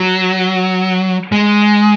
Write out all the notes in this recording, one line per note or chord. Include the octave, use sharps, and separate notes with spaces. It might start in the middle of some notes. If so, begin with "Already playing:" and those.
Already playing: F#3
G#3